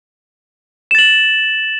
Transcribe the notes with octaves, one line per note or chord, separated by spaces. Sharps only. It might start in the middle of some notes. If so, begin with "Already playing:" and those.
A6 E7 F#7